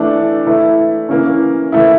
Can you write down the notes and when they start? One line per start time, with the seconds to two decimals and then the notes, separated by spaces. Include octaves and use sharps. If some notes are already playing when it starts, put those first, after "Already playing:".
Already playing: E3 A3 D4
0.46 E3 A3 E4
1.09 E3 A#3 C#4
1.72 E3 A3 E4